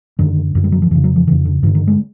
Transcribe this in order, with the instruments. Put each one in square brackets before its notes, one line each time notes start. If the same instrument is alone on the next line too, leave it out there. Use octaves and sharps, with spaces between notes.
[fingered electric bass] F#2 D3 D#3
F#2 D3
G3
F#3
F3
F2 E3
C#3
F#3
F3
C#3 E3
F2
D3
G2 D#3
D3
D#3
G#3